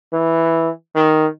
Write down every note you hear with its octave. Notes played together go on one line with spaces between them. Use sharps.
E3
D#3